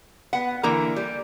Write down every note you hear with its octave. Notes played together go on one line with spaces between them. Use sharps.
B3 F#5
D3 E3 A#3 A#4 A#5
G3